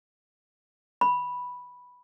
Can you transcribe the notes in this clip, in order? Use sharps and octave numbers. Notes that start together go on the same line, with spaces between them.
B5